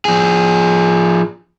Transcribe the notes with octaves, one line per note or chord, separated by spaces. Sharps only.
F3 G#4